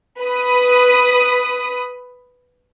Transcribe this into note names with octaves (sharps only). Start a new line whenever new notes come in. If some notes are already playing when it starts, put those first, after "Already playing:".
B4 B5 D#6